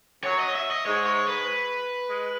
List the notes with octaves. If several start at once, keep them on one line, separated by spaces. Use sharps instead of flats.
F#2 F#3 C#5
D#5
E5
D#5
G#2 G#3 C#5
C#5
B4
G#3